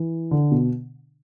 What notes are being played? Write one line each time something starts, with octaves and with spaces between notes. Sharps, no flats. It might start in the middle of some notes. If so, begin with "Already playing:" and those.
Already playing: E3
D3
B2